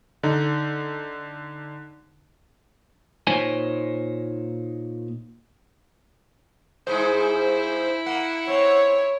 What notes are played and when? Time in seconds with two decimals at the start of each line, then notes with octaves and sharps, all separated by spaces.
0.23 D3 D#4
3.27 A#2 D#4 C5 C#5 G#5
6.87 G2 G#3 E4 C5
8.06 A#3 F#5
8.48 C4 C#5